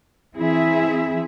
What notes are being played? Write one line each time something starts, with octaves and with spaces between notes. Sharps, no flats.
E3 C4 E4 G#4 E5